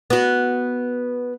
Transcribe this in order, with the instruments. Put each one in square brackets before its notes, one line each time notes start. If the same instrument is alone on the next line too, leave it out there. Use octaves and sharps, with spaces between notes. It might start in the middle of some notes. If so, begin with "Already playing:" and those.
[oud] B3 F#4